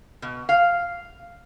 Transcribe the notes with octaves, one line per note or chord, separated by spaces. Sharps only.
B2
F5